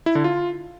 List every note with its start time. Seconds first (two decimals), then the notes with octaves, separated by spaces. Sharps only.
0.06 E4
0.15 D3
0.24 F4